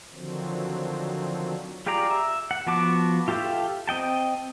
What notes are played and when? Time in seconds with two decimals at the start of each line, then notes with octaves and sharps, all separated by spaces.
0.13 D3 D#3 F3 F#3 C4
1.86 F4 G4 G#4 D5 A#5
2.11 E5
2.51 F#5
2.67 F3 B3 F#4 A5 D6
3.28 F4 G4 A4 E5 G5
3.88 C4 D#5 G5 A5